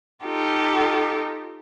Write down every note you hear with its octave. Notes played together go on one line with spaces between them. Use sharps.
D#4 F4 G4 A4